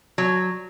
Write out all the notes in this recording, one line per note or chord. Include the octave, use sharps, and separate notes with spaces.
F#3